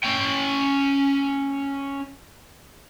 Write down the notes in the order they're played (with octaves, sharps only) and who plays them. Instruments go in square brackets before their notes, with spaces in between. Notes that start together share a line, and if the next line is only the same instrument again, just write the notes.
[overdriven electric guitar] C#4 G5